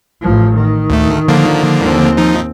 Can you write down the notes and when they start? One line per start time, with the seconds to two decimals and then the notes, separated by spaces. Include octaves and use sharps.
0.21 A1 F3
0.54 D#3
0.90 D2 A3
1.28 D3 F3 A#3
1.80 D#2 C4
2.17 F3 D#4